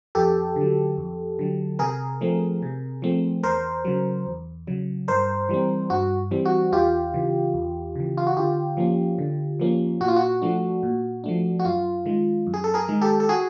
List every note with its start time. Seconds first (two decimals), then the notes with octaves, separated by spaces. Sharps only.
0.15 F2 G4 A4
0.56 D3 F#3
0.98 F2
1.39 D3 F#3
1.79 C3 G#4 A#4
2.21 F3 A3 C4
2.62 C3
3.02 F3 A3 C4
3.43 E2 A#4 C5
3.85 C#3 F#3
4.27 E2
4.67 C#3 F#3
5.08 G2 A#4 C5
5.49 E3 G3 C4
5.90 G2 F#4
6.31 E3 G3 C4
6.45 F#4
6.72 E2 F4 G4
7.14 C#3 E3
7.54 E2
7.95 C#3 E3
8.17 F4
8.27 F#4
8.36 D3 F4 G4
8.77 F3 A#3 C#4
9.18 D3
9.60 F3 A#3 C#4
10.01 A#2 F#4
10.08 F4
10.16 F#4
10.42 F3 A3 D4
10.83 A#2
11.24 F3 A3 D4
11.60 F#4
11.65 F#2 F4
12.06 D#3 G#3
12.47 F#2
12.54 G#4
12.64 A4
12.74 G#4 A#4
12.88 D#3 G#3
13.01 G4 A4
13.20 A4
13.29 F#4 G#4